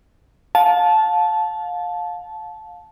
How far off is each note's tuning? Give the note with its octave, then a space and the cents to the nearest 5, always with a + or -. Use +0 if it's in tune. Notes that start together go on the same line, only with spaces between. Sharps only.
F5 +30 A5 -15